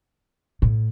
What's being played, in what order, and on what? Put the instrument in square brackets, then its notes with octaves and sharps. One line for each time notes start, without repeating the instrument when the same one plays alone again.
[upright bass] A2